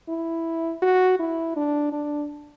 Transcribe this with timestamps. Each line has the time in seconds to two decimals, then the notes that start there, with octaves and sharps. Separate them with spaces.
0.09 E4
0.82 F#4
1.19 E4
1.56 D4
1.92 D4